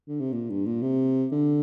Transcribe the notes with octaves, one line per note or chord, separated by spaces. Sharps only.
D3
C3
A#2
G2
A#2
C3
D3